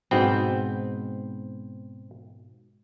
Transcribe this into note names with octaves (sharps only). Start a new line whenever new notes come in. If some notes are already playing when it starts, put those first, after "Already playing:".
G#2 B2 B3 C4 B4 G5